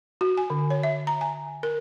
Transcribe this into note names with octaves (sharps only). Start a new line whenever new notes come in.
F#4
G#5
D3
C#5
E5
A#5
G#5
A#4